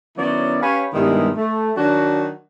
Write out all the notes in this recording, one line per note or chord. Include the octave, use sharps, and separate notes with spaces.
D#3 F#3 B3 C#4 E4 D5
C#4 G4 B4 C#5 F5 G#5
G2 B2 D#3 G3 G#3 E4
A3
D#3 F#3 D4 F#4